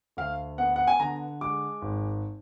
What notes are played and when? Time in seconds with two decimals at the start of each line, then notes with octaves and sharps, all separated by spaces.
0.17 D2 F5
0.58 B3 F#5
0.76 F#5
0.87 G#5
1.00 D3 A#5
1.41 G#3 D6
1.82 G#1